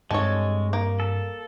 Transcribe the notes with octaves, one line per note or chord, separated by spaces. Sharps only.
G2 G3 G#3 C4 A4 C#5
A#3
A4